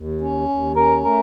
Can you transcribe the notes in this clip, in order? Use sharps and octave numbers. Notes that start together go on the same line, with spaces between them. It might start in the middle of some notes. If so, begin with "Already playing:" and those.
Already playing: D#2
C#4
D#2
C#4 A#4
A3 A#4